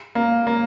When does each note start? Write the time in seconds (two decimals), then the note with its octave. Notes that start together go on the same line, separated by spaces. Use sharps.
0.15 A#3
0.47 A#3